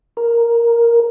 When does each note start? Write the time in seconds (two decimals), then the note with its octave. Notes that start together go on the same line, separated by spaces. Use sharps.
0.17 A#4